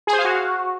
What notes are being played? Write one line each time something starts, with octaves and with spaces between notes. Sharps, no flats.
G#4
C5
F5
F#4